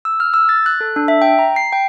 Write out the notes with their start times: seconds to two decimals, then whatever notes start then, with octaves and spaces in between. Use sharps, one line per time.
0.05 E6
0.20 F6
0.34 E6
0.49 A6
0.66 F#6
0.81 A4
0.96 D4
1.08 E5
1.22 G5
1.39 A#5
1.56 C7
1.73 G5